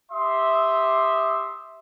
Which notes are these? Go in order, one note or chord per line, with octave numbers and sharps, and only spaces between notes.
G4 E5 C6 D#6